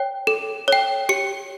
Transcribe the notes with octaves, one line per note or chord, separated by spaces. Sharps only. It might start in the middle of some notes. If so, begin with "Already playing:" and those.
Already playing: C#5 G5
A4
C#5 G5
G4 C#7